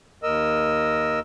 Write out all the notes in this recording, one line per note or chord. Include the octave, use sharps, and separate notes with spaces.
D#2 A#4 D#5 E6